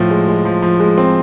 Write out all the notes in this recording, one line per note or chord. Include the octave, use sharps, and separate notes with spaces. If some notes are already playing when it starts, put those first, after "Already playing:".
Already playing: A2 F3
G#3
G#3
F3
F3
G#3
C4